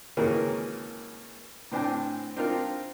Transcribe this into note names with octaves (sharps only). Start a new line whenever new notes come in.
G#1 C#3 E3 A#3 G#4 C#5
A2 C4 D4 C5 G#5
C4 D4 D#4 F4 A#4